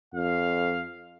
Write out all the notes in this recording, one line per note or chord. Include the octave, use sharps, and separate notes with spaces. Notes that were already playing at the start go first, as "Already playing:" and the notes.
F2 F5